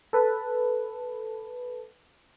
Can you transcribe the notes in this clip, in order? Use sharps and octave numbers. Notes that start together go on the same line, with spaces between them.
A4 B4